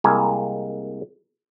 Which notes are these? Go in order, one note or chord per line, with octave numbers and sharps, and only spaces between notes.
C2 G#3 A#3 G#5